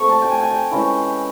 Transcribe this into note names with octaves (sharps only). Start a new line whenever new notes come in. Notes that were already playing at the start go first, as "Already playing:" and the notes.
Already playing: A#2 F3 A3 C4 C#6
A5
G5
G#5
G#5
G5
E3 G#3 C#4 E4